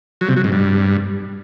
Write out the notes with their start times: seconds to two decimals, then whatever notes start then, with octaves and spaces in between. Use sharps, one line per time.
0.21 F#3
0.29 C3
0.36 F#3
0.44 G#2
0.52 G2